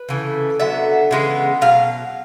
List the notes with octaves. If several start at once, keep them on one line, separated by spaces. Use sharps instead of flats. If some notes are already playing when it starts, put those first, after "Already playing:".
Already playing: B4
C#3 E3 A3
D3 F#3 B3 E5
C#3 E3 G#3 B3
B2 F#3 F5